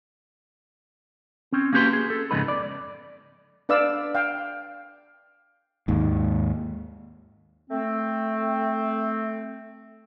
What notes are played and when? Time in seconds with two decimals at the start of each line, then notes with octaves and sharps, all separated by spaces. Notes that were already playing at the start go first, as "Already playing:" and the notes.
1.52 C4 C#4
1.73 A#3 C#4 F#4 G4 B4 C6
1.93 G#4
2.10 A4
2.31 F2 G#2 C#3 B3 D#4 B4
2.48 D5
3.69 D4 B4 D5 F5 E6
4.15 F5 G5
5.88 D#2 G#2
7.70 A3 C4